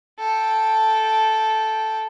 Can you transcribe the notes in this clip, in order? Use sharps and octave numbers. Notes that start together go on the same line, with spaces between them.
A4 G5